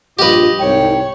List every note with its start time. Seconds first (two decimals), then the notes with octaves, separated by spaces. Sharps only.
0.19 A#1 G2 F4 G4 B4 D#5
0.59 C2 G#2 C#5 G5